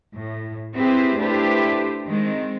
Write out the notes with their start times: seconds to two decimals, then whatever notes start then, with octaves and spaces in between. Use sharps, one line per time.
0.14 A2
0.75 C4 E4 G4 G#4 B4 C5
1.18 A3 D4 E4 G4 B4 C5
2.06 D#3 G#3 C4